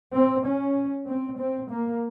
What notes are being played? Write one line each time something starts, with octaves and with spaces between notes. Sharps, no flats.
C4
C#4
C4
C4
A#3